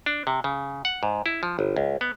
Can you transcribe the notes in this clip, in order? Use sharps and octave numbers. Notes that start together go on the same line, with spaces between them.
D4
C3
C#3
F#5
G#2
E4
F3
G1
C#2
B3